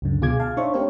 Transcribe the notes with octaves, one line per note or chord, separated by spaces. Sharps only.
C#2 F#2 D3
D2 B2 F4 G#4 D6 G#6
F5 A5
D4 D#4 C5 C#5 E5 C#6
A3 C4 D4 G4 A#4 C#5